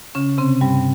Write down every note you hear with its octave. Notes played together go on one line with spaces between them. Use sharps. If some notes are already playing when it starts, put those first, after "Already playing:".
C#3 C#4
C3 C4
G2 G3